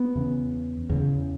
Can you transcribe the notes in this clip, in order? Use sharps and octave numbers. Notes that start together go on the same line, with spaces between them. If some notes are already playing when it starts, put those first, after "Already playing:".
Already playing: B3
E2 C#3
E2 C#3